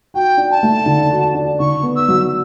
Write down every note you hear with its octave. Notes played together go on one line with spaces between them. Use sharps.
F#4 G5
D4
A5
A3
D3
F#4
D4
D3 C#6
B3
E6
F#3